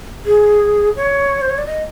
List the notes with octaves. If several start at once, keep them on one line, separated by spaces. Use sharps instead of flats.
G#4
C#5
C5
C#5
D5
D#5